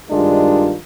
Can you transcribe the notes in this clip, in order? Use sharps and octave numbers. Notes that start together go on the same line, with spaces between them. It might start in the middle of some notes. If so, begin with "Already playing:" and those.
G2 D#3 G#3 D4 F4